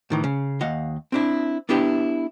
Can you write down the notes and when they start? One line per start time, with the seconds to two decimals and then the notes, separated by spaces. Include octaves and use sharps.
0.10 A2 D#3 E3
0.24 C#3
0.61 D#2 D#5 F5 F#5
1.12 C4 D4 E4
1.69 B3 D4 E4 G4 B4